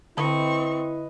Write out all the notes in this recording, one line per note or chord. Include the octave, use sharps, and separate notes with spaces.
D3 C4 E4 B4 D#5 B5 C#6